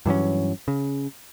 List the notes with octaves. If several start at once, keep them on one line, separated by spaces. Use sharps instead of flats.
G2 E3 F#3 C#4
C#3